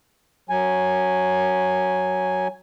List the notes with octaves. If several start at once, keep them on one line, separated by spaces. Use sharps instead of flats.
F#3 G#5